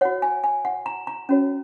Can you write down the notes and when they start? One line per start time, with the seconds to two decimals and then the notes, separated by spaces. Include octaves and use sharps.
0.01 C#5 F#5
0.05 F#4
0.22 G#5
0.44 G#5
0.65 F#5
0.86 A#5
1.07 A#5
1.29 C#4 F#4 C#5